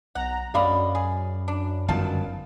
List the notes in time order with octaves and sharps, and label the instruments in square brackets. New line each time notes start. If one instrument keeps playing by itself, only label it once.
[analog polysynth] B1 A#5 [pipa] F#5
[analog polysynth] F#2 [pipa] D3 G3 D#5 [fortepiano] D5 F5 B5
[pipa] G#4
D4
[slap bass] G1 D#3 F#3 [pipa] F3 F4 A5